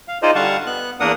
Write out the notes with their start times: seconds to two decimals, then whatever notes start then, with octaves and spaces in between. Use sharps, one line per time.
0.08 F5
0.22 D#4 F4 G#4 C5 D5 D#5
0.35 D3 G3 F5 F#5 A5 C#6
0.66 B3 F#6
1.00 E2 A#3 D4 A#4 F#5 D#6